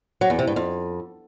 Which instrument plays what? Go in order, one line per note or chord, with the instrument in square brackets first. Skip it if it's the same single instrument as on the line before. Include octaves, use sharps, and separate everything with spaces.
[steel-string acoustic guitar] F#3
E2
C3
G2
F2